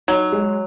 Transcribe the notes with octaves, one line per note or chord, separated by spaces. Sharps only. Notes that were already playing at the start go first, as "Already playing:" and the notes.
F#3 D#4
G#3